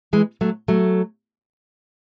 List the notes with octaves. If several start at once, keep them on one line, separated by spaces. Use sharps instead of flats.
E3 G#3
F#3 A3
F#3 A3